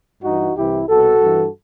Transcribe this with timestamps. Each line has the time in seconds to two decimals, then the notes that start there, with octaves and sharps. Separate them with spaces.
0.22 G2 E3 D#4 F#4
0.55 C2 C3 E3 E4 G4
0.88 C2 B2 F#4 A4
1.21 G2 E3